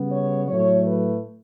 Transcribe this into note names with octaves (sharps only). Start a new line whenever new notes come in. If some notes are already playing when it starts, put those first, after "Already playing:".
Already playing: C#3 G3 B3
C#5
A2 F#3 A3 C#5
B4